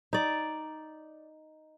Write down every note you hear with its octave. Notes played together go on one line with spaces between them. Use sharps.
D#4 D5